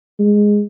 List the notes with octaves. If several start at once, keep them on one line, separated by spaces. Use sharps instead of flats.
G#3